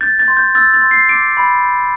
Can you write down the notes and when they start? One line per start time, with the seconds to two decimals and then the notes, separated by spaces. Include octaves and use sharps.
0.01 G6 A6
0.19 A6
0.28 C6
0.37 G6
0.55 E6 A6
0.74 A6
0.82 C6
0.91 C7
1.09 D6 D7
1.37 B5
1.63 G6